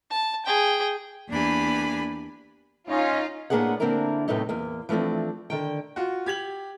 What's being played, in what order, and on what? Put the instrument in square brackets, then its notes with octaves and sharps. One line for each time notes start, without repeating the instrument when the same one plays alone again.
[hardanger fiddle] A5
G#4 G5
[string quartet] E2 A#3 D4 G4 G#5 B5
[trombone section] C#4 [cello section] D#4 D#5 F5 [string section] F4
[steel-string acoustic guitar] A2 A#3 B3 D4 G#4 F#5
D3 A#3 C4 D4 E4 A#4
F#2 A2 C3 A3 B3 D#4
E2 A#3
E3 F3 A3 C4 D4
D3 D#3 G5
[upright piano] F4 F#4
G4 G#6 F#7